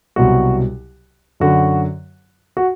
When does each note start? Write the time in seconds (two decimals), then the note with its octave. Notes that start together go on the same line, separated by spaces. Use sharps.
0.16 C2 B2 F#3 F#4
1.40 F#2 D3 F#3 F#4
2.57 F#4